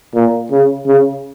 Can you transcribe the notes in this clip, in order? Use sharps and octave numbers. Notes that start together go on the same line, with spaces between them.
A#2
C#3
C#3